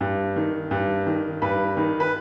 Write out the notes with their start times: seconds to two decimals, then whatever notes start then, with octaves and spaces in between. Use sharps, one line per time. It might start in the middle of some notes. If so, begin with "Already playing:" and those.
0.01 G2
0.36 D#3
0.71 G2
1.07 D#3
1.42 G2 B4
1.77 D#3
2.00 B4